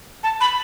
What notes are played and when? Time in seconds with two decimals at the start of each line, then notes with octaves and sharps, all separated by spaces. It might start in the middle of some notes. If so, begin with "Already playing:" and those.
0.23 A5
0.41 B5